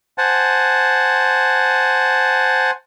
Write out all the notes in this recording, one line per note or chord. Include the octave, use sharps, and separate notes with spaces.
C5 F#5 G#5 A5